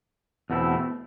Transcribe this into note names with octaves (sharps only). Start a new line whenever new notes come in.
E2 B2 A3 C4 E4